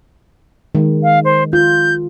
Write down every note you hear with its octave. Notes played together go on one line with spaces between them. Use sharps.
D#3 G#3
F5
C5
F4 G6